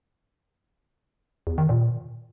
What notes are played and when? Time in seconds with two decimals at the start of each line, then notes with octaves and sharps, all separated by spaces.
1.47 E2
1.58 D#3
1.69 A#2